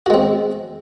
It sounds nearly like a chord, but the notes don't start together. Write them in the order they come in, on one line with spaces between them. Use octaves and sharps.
F#4 G#3 C4